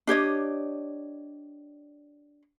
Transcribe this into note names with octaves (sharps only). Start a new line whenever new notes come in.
D4 G4 C#5 D#5